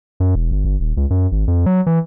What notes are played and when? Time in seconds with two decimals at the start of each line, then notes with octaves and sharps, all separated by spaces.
0.20 F#2
0.35 E1
0.51 G1
0.65 G1
0.80 D#1
0.97 C#2
1.10 F#2
1.32 G#1
1.48 F2
1.66 F#3
1.86 E3